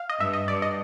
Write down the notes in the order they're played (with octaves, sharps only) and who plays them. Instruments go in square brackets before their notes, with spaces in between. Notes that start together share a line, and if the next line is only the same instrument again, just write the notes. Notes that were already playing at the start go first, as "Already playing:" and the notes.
Already playing: [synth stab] F5
D#5
[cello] G2 [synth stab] E5
[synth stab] D#5
[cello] G2 [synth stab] D5
[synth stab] D#5